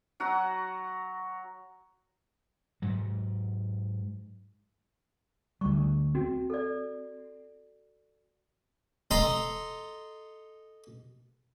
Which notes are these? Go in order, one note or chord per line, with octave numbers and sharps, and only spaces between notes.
F#3 F#4 F#5 A#5
G#2 F#3
D2 G3 C#6
C4 F#4
A4 D5
A4 D#5 A#5 C6